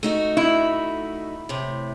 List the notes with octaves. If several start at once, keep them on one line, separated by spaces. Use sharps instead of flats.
A3 D#4 F#4
E4
A2 C3